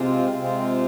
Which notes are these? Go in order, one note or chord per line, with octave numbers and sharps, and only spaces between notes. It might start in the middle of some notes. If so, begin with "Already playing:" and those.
Already playing: C3 G#3 C4 F4
C3 G#3 C4 F4